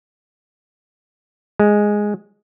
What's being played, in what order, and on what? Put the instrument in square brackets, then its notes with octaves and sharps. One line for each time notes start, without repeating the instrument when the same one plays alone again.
[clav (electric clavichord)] G#3